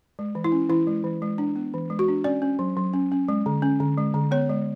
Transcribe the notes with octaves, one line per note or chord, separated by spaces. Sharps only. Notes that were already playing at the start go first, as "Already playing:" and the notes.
G#3
E3
E4
C#4
E3 E4
G#3
E3
G#3
D4
B3
E3
G#3
F#4
D4
C#4 D5
C#4
F#3
F#3
C#4
C#4
G#3
D3
C#4
D3
G#3
D3
B3 C#5
G#3